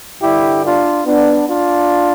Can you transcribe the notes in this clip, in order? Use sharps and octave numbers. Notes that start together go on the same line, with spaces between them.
G2 D3 G3 E4 G4
D4 F4
B3 D4
D4 F4